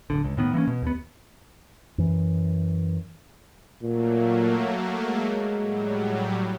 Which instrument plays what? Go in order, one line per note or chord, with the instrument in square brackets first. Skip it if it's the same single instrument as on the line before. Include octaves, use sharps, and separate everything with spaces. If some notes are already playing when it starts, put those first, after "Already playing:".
[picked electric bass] D1 G1 D3
C#2
A2 D#3 B3
E3 A#3 B3 C#4
B2
D#2 B3
[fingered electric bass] F#2 E3
[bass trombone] A#2 [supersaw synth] F#3 A3 A#3
[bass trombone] G#3
[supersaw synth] A2 F#3 G3